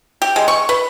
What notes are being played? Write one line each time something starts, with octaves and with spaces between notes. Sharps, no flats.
G4
G#3
C#6
B4